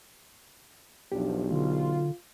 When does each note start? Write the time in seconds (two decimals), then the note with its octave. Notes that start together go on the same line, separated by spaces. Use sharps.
1.12 B1 E2 F3 D4 G4
1.50 D3 F4